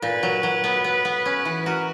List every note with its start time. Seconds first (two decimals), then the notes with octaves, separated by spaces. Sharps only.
0.02 A#2 B4
0.23 F#3
0.43 F#3
0.64 B3
0.84 B3
1.05 B3
1.25 C#4 B4
1.45 E3 B4
1.61 B4
1.66 F#4 A#4